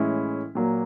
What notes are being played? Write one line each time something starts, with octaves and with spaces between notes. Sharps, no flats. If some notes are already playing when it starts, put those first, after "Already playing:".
Already playing: A2 E3 G#3 C#4 E4
A#2 F#3 A#3